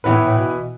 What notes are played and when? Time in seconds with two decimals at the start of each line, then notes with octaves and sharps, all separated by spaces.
0.04 A2 E3 B3 E4 B4
0.26 A2
0.38 B2